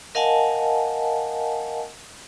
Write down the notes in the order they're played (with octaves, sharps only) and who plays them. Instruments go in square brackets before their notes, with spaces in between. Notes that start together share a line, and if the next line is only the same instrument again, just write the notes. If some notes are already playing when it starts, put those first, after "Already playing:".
[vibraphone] A#4 D#5 F5 F#5 G#5 A5